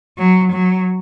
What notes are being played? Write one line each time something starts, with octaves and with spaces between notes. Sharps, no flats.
F#3
F#3